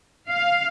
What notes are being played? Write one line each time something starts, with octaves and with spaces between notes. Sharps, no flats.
F5